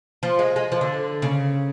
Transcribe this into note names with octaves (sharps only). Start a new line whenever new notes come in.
F3
G#3
G#3
F3
D3
C#3